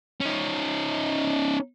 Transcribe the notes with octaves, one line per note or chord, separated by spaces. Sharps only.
C#4 D#4